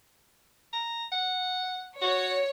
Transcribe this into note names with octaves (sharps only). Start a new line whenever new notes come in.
A#5
F#5
F#4 C#5